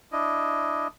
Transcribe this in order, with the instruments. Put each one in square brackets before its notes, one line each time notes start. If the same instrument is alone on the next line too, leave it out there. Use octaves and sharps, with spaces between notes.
[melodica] D4 E4 D#5